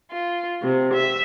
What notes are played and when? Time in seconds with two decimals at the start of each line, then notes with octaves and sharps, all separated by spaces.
0.11 F4
0.61 C3
0.93 E5